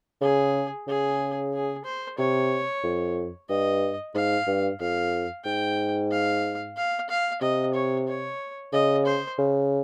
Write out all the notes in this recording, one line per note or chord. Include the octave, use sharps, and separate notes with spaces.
C#3 G#4
C#3 G#4
G#4
C5
C3 C#5
F2
G2 D#5
G#2 F5
G2
F2 F5
G#2 G5
F5
F5
F5
C3 D#5
C#5
C#5
C#3 D#5
C5
C#3